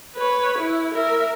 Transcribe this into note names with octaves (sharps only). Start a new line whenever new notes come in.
B4 C#5
E4
A#4 E5